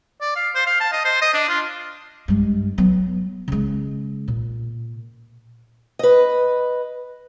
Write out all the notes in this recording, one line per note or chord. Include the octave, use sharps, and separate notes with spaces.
D5
F5
C5
F5
A5
D#5
C5
D#5
D4
F4
G2 G#3
F#3 B3
C#3 G#3
A#2
B4 D#5